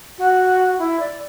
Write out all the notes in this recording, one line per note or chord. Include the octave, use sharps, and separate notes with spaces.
F#4
E4
D5